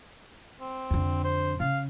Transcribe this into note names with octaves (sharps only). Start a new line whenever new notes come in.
C4
F2 D3
C5
C#3 F5